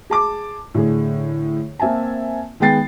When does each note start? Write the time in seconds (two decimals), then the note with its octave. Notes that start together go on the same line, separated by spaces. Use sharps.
0.10 G#4 A5 D6
0.74 A2 D3 G#4
1.80 A#3 C4 E5 G#5 A5
2.60 D#3 G#3 B3 G5 A6 C7